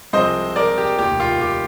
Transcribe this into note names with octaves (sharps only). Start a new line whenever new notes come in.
C2 C3 F3 G#3 C4 C5 D#5
A#4 D5
G4
F1 D#2 D#3 G4
F4
G4